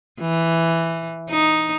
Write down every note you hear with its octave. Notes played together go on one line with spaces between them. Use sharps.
E3
D#4